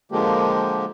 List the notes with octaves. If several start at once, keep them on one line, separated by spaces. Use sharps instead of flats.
D3 F3 G#3 A#3 G4